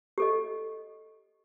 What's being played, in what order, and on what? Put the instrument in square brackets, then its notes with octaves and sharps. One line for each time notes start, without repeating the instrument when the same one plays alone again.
[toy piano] G4 A4 D#5